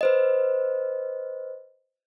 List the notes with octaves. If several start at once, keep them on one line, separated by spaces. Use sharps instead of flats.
B4 C5 D#5